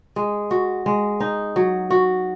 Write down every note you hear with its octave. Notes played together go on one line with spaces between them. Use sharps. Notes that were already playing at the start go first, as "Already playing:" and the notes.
G#3
F#4
G#3
D#4
F#3
F#4